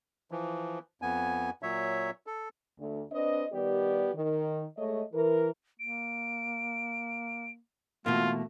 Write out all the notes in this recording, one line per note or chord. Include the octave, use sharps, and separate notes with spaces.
E3 F3
F2 B3 G#5
A#2 F#3 C#5 E5
A4
D2
C4 D4 B4 D#5
D#3 G3 B3 G4 D5
D#3
G#3 A3 C#5 D#5
E3 A#4
A#3 D7
B2 E3 A3 A#3 F4